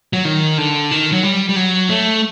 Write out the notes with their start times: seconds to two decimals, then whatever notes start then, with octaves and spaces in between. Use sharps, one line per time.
0.13 F#3
0.25 D#3
0.58 D3
0.91 D#3
1.12 F#3
1.23 G3
1.49 G3
1.56 F#3
1.89 A3